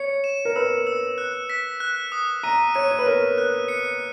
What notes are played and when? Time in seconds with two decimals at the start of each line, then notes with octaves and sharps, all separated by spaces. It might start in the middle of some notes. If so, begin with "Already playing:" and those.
Already playing: C#5 C#7
0.24 E7
0.45 A#4
0.56 B4 E6
0.87 E6
1.18 F#6
1.50 B6
1.80 F#6
2.12 D#6
2.43 A#5 D#7
2.75 C#5 D#7
2.91 C#5
2.99 B4
3.06 A#4 D#7
3.38 F#6
3.68 C#7